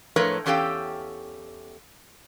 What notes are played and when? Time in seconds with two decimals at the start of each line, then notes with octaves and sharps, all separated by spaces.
0.16 A2 F3 A3 A#4 B4 C#5
0.46 E2 C#4 G4 A4 F5 G5